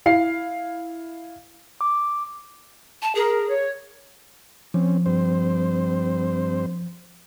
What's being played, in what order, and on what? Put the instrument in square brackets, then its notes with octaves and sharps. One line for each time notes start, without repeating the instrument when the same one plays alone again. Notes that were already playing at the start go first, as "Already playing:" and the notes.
[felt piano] E4 F5 C7
[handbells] D6
[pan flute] A5
[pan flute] G#4 [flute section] A#4
[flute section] C#5
[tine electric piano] F3 [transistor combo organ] C4 C#4
[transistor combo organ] G2 C4 C5